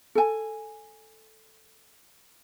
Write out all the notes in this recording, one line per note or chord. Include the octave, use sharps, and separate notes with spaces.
A4 G#5